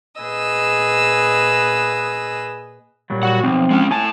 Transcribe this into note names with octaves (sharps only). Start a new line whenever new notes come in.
A#2 G#4 B4 D#5 E6
A#2 F#3 G3
F#4 F#5
B1 F3 C4
G#3 C#4
A2 G#5 A5